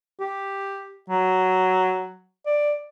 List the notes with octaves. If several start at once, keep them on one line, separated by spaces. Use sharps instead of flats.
G4
F#3
D5